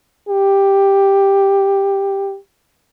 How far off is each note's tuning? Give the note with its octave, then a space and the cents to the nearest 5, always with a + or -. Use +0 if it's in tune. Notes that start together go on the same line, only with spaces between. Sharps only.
G4 +5